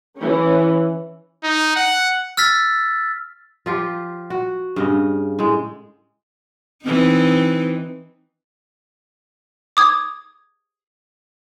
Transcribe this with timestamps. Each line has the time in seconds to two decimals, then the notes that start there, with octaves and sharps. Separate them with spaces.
0.17 E3 C#4
1.43 D#4
1.76 F#5
2.37 E6 F6 A6 B6
3.66 F3 F4 G4
4.30 F#4
4.76 G2 C#3 D#5
5.39 A2 G#3
6.85 E3 C4 D#4
9.77 D6 D#6 G#6